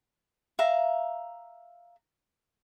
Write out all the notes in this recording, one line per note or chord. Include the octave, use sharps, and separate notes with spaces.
E5 F5 A#5